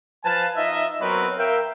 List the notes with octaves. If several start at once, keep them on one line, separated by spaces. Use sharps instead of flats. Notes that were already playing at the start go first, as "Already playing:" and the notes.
F3 B4 F5 G#5 A5
D#4 F4 D#5 E5
F#3 B3 C4 A#4 B4 C#5
A#4 E5 F5 G5